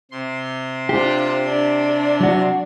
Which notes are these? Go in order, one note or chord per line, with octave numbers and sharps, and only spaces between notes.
C3 C6
D4 F4 G4 C5
D4
F#3 F#4